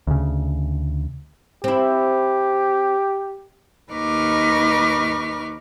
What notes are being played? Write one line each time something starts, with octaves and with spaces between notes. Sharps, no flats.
D2 C#3
C4 E4 G4
D#2 D#4 B4 C#6 D6 F6